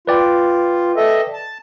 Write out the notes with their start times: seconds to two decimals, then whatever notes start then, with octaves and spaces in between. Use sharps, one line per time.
0.07 F4 B4 D5 G5
0.96 A4 D#5 E5
1.33 A5